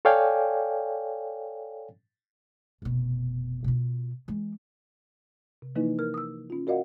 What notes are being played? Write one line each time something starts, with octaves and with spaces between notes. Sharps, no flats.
A4 C#5 D5 F5 G5 G#5
F1 B2
B2 F4
E3 G#3
C3
E3 F3 A#3 D#4 E4 B4
A#4 F6
D#6 E6
C#4 F4
F#4 A#4 D5 D#5 F5 F#5